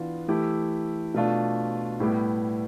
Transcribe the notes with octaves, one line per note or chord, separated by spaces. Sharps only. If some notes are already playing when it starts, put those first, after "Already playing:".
Already playing: E3 B3 D4 F4
E3 A3 E4 G4
B2 A3 D4 F4
A2 G3 B3 E4 G4